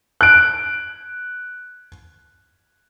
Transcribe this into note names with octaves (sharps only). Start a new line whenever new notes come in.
F#6 D7